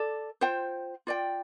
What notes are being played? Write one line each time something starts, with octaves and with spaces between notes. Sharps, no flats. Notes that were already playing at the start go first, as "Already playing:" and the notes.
Already playing: A4 D5
F4 C5 G5
F4 D5 G5